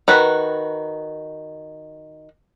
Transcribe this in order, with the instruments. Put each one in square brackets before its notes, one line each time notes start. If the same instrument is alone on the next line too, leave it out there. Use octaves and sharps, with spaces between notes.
[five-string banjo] D#3 F#4 B4